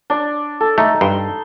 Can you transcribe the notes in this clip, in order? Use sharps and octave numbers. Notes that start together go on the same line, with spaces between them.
D4 D5
A4
A3 D#4
G2 C6